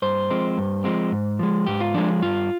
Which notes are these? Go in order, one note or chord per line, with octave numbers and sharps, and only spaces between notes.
G2 C5
F3 G#3 C4
G2
F3 G#3 C4
G#2
F3 G#3
G#2 G4
F4
F3 G#3 D4
G2 F4